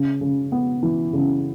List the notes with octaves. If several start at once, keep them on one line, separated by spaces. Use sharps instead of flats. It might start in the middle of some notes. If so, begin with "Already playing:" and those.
Already playing: C#3
C#3
B3
E3
C#3